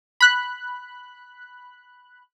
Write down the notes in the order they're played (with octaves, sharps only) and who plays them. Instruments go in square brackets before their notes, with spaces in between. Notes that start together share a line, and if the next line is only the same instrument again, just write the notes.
[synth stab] B5 F#6